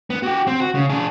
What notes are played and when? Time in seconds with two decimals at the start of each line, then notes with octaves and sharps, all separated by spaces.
0.10 B3
0.23 F#4 G4
0.47 C4
0.60 F#4
0.75 C#3
0.90 D4 G#4